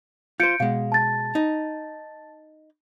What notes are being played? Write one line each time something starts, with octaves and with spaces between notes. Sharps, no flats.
F4 C5 G6 C#7 D7
B2 G#3 F5
A5 A6
D#4